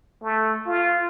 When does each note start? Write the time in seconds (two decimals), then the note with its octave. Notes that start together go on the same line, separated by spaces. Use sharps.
0.23 A3
0.67 F4